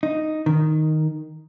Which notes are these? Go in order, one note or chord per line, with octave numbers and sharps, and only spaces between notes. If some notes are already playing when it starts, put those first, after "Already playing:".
D#4
D#3